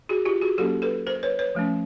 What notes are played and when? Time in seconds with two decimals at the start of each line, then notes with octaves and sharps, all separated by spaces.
0.09 F#4 G#4
0.25 F4 G4
0.41 F#4 G#4
0.58 F#3 A#3 C#4 G4 A4
0.82 A4 B4
1.07 A#4 C5
1.23 B4 C#5
1.39 B4 C#5
1.55 F3 A3 C#4